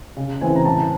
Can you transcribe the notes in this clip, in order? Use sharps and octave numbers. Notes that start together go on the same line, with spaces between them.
C#3
E3 A3 C4 G#5
A#5
A2 A5